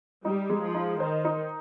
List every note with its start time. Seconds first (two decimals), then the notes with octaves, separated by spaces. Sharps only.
0.24 G3 D#4
0.50 G#3
0.62 F3
0.74 D#4
1.00 D#3 C5
1.25 D#4